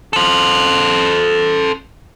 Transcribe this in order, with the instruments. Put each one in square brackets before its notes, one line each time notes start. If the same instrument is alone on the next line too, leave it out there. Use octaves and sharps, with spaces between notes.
[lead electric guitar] A4 C5